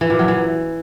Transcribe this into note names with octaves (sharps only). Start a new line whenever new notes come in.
E3
A#2
F#3
E3